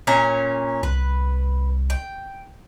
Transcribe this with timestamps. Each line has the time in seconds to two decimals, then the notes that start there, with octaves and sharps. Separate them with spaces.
0.07 A#2 C#4 A#5
0.83 C2 B4
1.90 G5